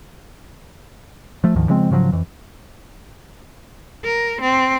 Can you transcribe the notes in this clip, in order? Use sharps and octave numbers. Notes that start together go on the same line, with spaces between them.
F3 A3
D2 G#2 D#3 F3
C#3 F3 G#3 C4
G#2 C#3 F3 F#3
F2 E3
A#4
C4